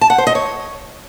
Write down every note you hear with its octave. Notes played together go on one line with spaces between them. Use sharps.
A5
F#5
C5
D#5
C#5